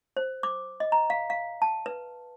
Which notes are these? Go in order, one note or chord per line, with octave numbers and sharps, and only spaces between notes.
C5
D6
D#5
A#5
F5
F5
A5
B4